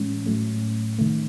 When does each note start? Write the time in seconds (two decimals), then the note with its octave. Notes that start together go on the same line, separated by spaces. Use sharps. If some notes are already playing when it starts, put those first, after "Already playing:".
Already playing: A2 E3 G#3 C#4
0.26 A2 F#3 A3
0.99 C3 D#3 A3